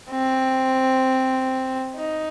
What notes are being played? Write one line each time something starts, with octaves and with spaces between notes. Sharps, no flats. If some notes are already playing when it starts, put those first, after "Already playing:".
C4
D#4